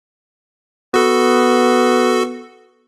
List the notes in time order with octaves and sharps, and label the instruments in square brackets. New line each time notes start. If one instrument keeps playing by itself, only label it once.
[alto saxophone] B3 [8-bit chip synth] F#4 A4